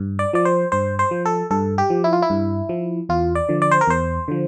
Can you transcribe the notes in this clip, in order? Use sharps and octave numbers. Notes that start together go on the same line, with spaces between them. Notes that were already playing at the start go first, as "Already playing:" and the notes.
Already playing: G2
D5
F3 D5
C5
G2 C5
C5
F3
A4
G2 A4
G4
F3
E4
F4
E4
G2
F3
E2 F4
D5
D3 F3
D5
C5
A#4
E2 C5
D3 F3